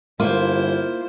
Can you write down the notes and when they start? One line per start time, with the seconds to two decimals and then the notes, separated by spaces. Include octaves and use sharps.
0.20 G1 A#3 E4 F4 C5